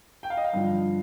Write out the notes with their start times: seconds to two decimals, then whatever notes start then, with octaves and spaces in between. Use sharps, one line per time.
0.23 G5
0.30 F5
0.37 D#5
0.45 F5
0.53 G2 D3 F3